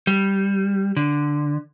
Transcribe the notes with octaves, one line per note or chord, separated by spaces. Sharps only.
G3
D3